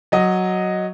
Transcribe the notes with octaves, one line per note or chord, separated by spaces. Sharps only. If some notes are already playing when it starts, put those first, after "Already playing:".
F#3 D#5